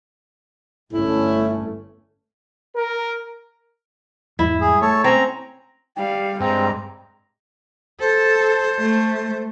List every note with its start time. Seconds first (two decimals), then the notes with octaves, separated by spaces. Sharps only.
0.93 G1 A3 C#4 E4
2.75 A#4
4.39 E2 G#2 G3 E4
4.61 G#4
4.82 A3 A4 C#5
5.04 C4 C#4 A#5
5.96 G3 F5 G5
6.40 G2 G#3 C4 A#5
8.00 A4 C5
8.79 A3